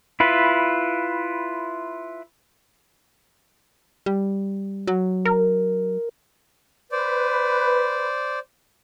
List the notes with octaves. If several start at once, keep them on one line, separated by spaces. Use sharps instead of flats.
E4 F4 B4
G3
F#3
A#4
B4 C5 D5